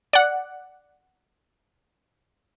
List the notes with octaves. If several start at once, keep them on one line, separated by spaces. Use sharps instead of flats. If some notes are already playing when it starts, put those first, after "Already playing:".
D5 F#5